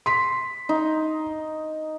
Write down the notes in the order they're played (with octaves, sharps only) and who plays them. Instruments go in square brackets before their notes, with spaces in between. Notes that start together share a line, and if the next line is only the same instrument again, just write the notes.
[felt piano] C6 B6
[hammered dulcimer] D#4